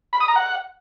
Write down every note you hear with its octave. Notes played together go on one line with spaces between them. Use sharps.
B5
D#6
A#5
F#5